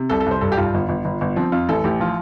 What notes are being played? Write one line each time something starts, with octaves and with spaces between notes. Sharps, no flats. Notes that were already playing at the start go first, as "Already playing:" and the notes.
Already playing: C3
C2 A4
A4
C2 C5
G2 A4
G4
G2 F4
G1
G1
G1
G1
F3 C4
F2 F4
A1 A4
A1 G4
F3 F4